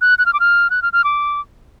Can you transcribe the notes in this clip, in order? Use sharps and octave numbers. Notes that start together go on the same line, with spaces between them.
F#6
F#6
F6
D6
F6
F#6
F6
F6
D6